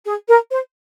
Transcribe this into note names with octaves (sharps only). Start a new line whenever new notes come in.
G#4
A#4
C5